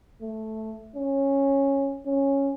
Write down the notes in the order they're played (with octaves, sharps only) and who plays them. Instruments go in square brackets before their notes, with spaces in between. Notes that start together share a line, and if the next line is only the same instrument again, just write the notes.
[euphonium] A3
C#4
C#4